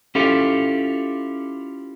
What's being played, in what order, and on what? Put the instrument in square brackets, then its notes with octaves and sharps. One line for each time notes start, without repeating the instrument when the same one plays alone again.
[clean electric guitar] C#4 E4 F4 G4 A4